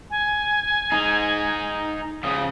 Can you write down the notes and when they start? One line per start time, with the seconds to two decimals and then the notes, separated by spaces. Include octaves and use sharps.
0.10 G#5
0.92 D#4 G#4
2.24 C#3 F3 D#6